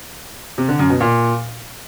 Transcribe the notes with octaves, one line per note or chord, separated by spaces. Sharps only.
C3
D3
F#2
B2
A#2